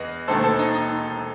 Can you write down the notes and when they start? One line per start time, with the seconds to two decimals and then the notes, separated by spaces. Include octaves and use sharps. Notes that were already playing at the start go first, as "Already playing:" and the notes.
Already playing: E2 B4 D#5
0.28 E1 D#2 D#3 A3 A4 C5
0.44 A4 C5
0.59 D#4
0.74 D#4